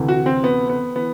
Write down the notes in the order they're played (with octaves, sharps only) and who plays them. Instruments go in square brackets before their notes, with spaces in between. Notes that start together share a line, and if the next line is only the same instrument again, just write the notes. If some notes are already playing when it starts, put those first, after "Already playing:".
Already playing: [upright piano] D2 C3 E3
F#4
C4
B3
B3
E3 B3